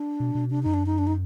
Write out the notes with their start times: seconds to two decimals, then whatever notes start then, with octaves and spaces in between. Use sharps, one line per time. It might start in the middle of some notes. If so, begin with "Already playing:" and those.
Already playing: D4
0.20 B2
0.35 B2
0.50 C3 D4
0.63 F#2 D#4
0.74 D4
0.86 D#4
0.98 D4
1.07 D#4